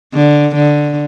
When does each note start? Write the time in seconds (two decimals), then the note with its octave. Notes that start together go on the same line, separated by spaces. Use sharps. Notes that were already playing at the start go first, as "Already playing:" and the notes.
0.14 D3
0.55 D3